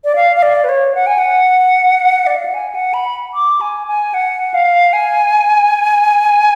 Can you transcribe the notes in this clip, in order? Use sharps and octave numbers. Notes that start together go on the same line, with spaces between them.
D5
F5
F5
D5
B4
C#5
F#5
G#5
F#5
D5
F5
F#5
G#5
F#5
B5
D6
G#5
G#5
F#5
F5
G#5